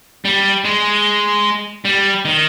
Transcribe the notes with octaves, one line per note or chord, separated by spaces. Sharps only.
G3
G#3
G3
D#3